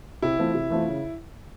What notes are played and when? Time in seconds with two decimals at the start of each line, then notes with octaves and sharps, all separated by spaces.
0.22 C3 E4
0.39 E3 A3 C4 F4
0.55 C3
0.70 E3 A3 C4 F4
0.87 C#3